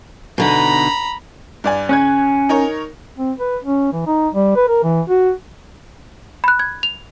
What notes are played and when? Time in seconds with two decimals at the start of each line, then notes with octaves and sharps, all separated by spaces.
0.38 B2 D3 D#4 A#5 B5
1.64 G2 D5 G#5
1.89 C#3 C#4 F#6 G#6
2.49 D#4 A#4 C#5
3.18 C4
3.39 B4
3.64 C#4
3.93 E3
4.06 D#4
4.34 G3
4.56 B4
4.68 A#4
4.84 E3
5.09 F#4
6.44 B5 F#6
6.59 G#6
6.83 F7